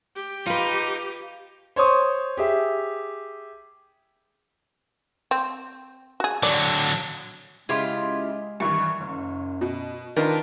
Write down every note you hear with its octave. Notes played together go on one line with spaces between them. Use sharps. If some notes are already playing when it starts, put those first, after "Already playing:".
G4
D#4 F4 B4
C5 C#5 C6 C#6 D#6
G4 G#4 E5
C4
F#4 G#4
D3 F#3 D5
C#3 G#3 E4 F4 G4
G2 D#3 E3 C#6
F#1 F#2
B2
D#3 D4 F4 A#4 B4 A5